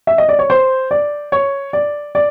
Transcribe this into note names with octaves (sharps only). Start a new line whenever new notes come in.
E5
D#5
D5
C#5
C5
D5
C#5
D5
D5